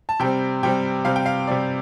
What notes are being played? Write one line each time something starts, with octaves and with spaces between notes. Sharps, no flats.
A5
C3 G3 C4 G5
C3 G3 C4 G5
C3 G3 C4 F5
G5
F5
C3 G3 C4 D5